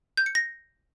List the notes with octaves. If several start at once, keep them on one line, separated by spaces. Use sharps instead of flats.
G6
C#7
A#6